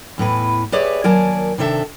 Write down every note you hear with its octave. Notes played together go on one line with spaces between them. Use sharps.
E2 A2 E3 B4
G4 G#4 B4 C#5 D5 E5
D#2 F#3 A#4 D5 G#5 A5
C3 D#3 D4 A4 D5 E5